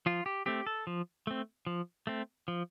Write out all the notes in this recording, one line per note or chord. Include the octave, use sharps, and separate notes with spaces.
F3 F4
G4
A3 C4 G4
A4
F3
A3 C4
F3
A3 C4
F3